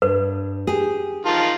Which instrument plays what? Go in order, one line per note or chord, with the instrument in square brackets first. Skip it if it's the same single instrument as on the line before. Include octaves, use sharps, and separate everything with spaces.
[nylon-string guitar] G2 [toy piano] B4
[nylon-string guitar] G4 G#4
[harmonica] D#3 F4 A5